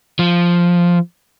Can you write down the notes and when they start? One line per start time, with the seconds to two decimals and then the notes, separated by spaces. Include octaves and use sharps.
0.19 F3